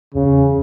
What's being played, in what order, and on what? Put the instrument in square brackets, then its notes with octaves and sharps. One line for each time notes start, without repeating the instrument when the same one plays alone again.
[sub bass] E2 [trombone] C#3